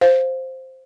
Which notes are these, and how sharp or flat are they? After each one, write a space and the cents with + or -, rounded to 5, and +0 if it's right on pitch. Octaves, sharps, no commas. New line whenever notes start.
C5 +0 F5 +0